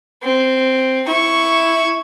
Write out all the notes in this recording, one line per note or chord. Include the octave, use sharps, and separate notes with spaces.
C4
E4 C#6